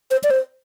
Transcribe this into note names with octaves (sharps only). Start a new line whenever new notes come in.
C5
D5
C5